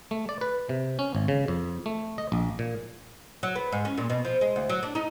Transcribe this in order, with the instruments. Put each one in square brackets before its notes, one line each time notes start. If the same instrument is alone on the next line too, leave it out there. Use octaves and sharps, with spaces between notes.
[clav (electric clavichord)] A3
D5
B4
C3
C#4
G#1
C#3
F2
A3
D#5
A#1
A#2
[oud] F#3
B3
G#2
C#4
A#2
B2
F3
G#3
D2
F#3
D4
D#4